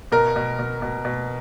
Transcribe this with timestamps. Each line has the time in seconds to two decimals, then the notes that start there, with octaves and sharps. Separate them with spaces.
0.12 B2 A#4
0.36 B2
0.59 B2
0.82 B2
1.05 B2